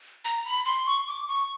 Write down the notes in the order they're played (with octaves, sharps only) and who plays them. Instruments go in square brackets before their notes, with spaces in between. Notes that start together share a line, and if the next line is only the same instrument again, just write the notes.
[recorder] A#5
B5
C6
C#6
D6
C#6